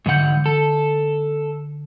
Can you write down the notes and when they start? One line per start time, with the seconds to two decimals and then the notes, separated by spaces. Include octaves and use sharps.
0.06 G#2 D3 E3 F#5 G6
0.46 A4